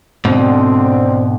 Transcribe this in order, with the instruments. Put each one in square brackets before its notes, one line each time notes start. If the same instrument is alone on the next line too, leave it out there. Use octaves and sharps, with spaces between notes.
[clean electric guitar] G#2 B2 [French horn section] D3 C4